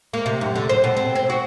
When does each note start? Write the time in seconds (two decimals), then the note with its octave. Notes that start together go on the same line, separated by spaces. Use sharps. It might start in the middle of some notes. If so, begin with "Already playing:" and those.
0.13 A#3
0.26 C3
0.41 F#2
0.55 D3
0.69 C5
0.84 B2
0.97 C4
1.15 C4
1.30 F#4